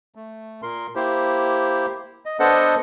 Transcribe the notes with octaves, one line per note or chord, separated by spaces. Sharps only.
A3
A#2 A#4 C6
A#3 E4 G4 C5
D#5
B3 D4 A4 C5 D#5 F#5